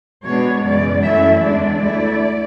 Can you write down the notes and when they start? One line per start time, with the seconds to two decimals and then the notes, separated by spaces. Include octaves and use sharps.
0.23 B2 G#3 B3 D4 C#5
0.63 F#2 C#3 E3 G#3 D5
1.02 F#2 E3 A3 C#4 E4 E5
1.41 E2 D3 G#3 D4 D5
1.80 D2 D3 A3 E4